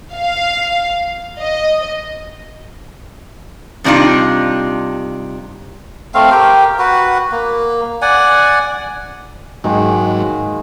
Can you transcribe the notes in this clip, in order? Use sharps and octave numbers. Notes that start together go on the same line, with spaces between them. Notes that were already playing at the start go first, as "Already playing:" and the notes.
F5
D#5
G2 C3 D4 D#4 F4
A3 C4 F5
G4 A#4 G5
F#4 B4
A#3
D5 F#5 G#5
G#2 D#3 F#3 G#3 A#3